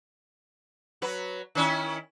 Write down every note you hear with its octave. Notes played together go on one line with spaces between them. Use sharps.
F#3 B4
D#3 C#4 E4